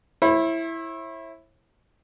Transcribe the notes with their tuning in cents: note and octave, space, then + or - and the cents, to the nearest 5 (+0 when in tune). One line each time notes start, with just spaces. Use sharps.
E4 +0 C#5 -45 B5 +0